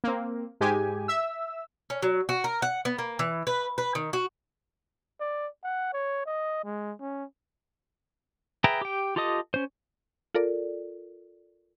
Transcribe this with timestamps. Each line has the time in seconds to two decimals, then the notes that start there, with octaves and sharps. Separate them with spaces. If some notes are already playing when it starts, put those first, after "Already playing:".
0.04 A#3 C4
0.61 G#2 G#3 G4 G#5
1.08 E5 E6
1.90 C#4
2.02 F#3
2.29 F#4
2.44 A#4
2.62 F#5
2.85 B3
2.99 A#3
3.19 E3
3.47 B4
3.78 B4
3.95 D#3
4.13 F#4
5.20 D5
5.64 F#5
5.93 C#5
6.26 D#5
6.64 G#3
7.00 C#4
8.64 G#4 B4 E5 G5 A#5
8.81 G4 G5
9.16 F4 G4 A4 D#5 D#6
9.54 C#4 C5
10.35 F4 A4 A#4 D5